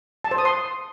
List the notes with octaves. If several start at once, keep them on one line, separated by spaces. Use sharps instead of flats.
A5
C5
D#6
C6